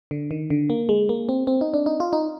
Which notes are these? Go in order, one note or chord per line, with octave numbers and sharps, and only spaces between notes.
D3
D#3
D3
A#3
G#3
A#3
C4
C4
D#4
D4
D#4
F4
D#4